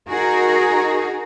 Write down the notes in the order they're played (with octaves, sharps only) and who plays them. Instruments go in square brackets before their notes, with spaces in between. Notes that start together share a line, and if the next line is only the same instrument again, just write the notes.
[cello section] D#4 F#4 G#4 A#4